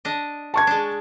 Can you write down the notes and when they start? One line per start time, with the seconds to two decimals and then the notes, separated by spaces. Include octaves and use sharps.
0.05 D4 D#5
0.54 A5 C#6 G#6
0.67 G#3 D4